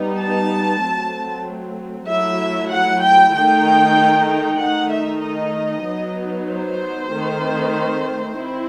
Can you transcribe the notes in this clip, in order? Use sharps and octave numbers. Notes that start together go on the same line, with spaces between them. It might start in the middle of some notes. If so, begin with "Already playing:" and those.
Already playing: G3 B3 D#4
A5
F#3 A3 C4
F#3 A3 E4 E5
F#5
G5
D#3 A3 D#4 G5
D#3 A3 D#4 F#5
E5
D#5
F#3 B3 D#4
C5
D#3 A3 C4
C4 E4